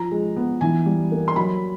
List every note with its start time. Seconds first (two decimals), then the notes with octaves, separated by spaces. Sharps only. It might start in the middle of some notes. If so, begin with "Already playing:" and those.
Already playing: F3 A#5
0.11 G#3
0.36 B3
0.61 E3 G#5
0.86 G3
1.12 A#3
1.28 C6
1.36 F#3 B5